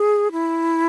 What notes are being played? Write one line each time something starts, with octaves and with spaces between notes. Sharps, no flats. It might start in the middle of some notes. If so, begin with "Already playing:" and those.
Already playing: G#4
E4